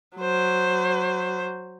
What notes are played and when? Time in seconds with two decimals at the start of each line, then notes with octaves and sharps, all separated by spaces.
0.16 F#3 C5